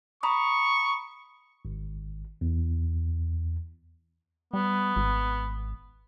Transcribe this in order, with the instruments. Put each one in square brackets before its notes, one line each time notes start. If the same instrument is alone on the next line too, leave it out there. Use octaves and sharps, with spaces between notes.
[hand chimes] A#5 B5 D#6 [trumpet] C#6
[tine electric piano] G#1
E2
[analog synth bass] G3 [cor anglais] B3
[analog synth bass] G#1